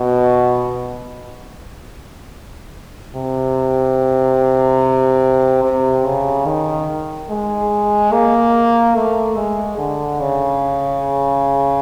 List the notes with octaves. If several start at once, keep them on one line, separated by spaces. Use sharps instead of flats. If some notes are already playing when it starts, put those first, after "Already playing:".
Already playing: B2
C3
C3
C#3
D#3
G#3
A#3
A3
G#3
D3
C#3